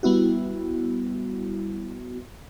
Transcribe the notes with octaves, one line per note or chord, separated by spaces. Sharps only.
G3 B3 E4 F#4